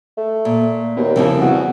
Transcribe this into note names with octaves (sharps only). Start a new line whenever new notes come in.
A3
A#2
D#2 B2
C2 F2 C#3 E3
E2 F#4